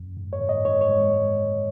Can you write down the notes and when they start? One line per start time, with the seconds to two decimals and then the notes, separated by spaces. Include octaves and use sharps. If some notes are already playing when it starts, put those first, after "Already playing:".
Already playing: F#2
0.17 G#2
0.33 C#5
0.41 G#2
0.49 D#5
0.65 G#2 C#5
0.81 C#5
0.89 G#3